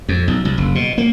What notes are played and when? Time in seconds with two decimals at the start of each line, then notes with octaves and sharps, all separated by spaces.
0.09 F2
0.28 B1
0.45 C2
0.58 F#1
0.75 B2
0.98 A#3